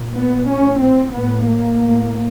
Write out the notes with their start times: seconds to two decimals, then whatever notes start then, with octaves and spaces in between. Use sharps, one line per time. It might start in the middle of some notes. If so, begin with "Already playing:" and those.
Already playing: A#2
0.16 B3
0.48 A2 C#4
0.81 C4
1.14 A2 B3
1.47 A#3
1.80 A2